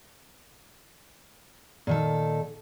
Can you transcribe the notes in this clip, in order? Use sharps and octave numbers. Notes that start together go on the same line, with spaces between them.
A#2 D#3 A4